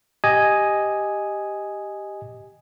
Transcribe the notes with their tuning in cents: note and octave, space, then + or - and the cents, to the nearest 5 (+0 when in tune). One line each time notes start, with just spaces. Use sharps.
G4 +0 D#5 +0 G#5 +0